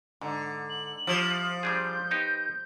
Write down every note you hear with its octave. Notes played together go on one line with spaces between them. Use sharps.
G#2 D3
F#7
F3 G3 E4
G3 D4 G#4 G6
B3 D#4 G4